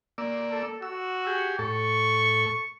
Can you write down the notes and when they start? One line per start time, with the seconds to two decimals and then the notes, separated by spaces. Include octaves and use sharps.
0.18 A#3 D5 E6
0.51 A4
0.82 F#4 E6
1.27 G4 G#4
1.59 A2 A4 C#6